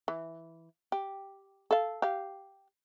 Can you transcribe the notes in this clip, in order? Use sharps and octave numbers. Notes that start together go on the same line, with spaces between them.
E3
G4
A4 F5
G4 F5